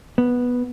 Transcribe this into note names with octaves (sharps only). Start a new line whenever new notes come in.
B3